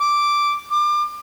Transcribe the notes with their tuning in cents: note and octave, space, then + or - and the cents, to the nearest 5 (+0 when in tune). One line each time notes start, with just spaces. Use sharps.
D6 -5
D6 +30